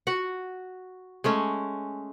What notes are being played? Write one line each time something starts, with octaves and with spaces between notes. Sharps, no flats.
F#4 F#5
G#3 A3 C#4